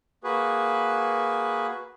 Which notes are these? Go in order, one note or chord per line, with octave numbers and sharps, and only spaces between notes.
A#3 F#4 G#4 B4